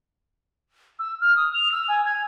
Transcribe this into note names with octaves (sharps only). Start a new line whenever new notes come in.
E6
F6
D#6
F7
E6
G#5
G#6